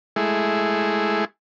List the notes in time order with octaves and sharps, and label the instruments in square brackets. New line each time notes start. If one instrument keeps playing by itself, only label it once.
[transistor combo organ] G#3 A3 E4 G#4